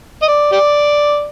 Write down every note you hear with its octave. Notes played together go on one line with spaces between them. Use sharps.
D#5
D5
G4 D5